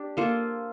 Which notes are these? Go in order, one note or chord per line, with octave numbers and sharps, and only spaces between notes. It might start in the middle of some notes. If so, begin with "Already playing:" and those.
Already playing: D4 G4
A#3 F4 A4 C5